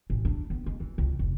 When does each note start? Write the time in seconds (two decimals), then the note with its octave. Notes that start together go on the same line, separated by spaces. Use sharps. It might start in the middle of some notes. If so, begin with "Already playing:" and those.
0.10 A1
0.25 D4
0.50 B3
0.66 G#3
0.80 E3
0.98 C#2
1.19 F1